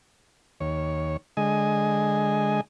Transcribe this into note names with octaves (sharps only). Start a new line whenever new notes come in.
D#2 C#5
D3 G#3 D#5 G#5